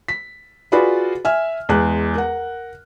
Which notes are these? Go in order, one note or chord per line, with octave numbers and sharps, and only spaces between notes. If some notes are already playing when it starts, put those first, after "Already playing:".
B6
F4 F#4 G#4 B4 D5 B5
E5 G#5 F6
E2 G#3 F#6
A#4 F#5